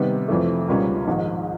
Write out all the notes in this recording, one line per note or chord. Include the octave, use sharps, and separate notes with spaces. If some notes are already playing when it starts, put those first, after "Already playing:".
Already playing: C3 D#3 G3 B3
F2 C3 E3 A3
C#2 B2 G3 A#3 C#4
A#1 G#2 D#3